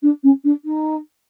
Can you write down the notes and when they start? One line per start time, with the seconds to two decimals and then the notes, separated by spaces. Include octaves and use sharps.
0.02 D4
0.23 C#4
0.44 D4
0.65 D#4